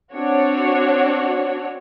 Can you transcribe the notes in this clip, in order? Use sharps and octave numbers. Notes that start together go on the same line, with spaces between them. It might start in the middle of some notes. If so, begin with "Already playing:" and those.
C4 D4 F#4 C#5